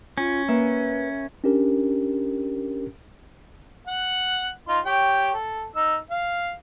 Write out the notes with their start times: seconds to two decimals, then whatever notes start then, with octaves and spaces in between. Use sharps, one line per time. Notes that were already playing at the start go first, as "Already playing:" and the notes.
0.18 C#4 F4
0.48 A#3 B4 E5
1.44 C#4 D4 G4 A#4
3.88 F#5
4.68 D#4 F4 C6
4.85 G4 C#5 G5
5.34 A4
5.76 D#4 E6
6.10 F5